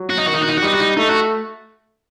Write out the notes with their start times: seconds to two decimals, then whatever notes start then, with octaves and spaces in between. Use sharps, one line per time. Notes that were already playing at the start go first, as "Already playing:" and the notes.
Already playing: F#3
0.10 F#4
0.18 D#4
0.26 D#3 F#4
0.34 D#4
0.41 F#4
0.49 D#4
0.57 F#4
0.62 G3 D#4
0.72 F#4
0.80 D#4
0.97 A3 D#4
1.09 F#4